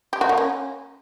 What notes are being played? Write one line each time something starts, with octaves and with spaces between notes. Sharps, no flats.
G4
F#4
A#3
C#4